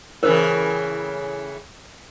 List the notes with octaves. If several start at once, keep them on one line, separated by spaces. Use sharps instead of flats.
A2 C#3 E3 A#4 C5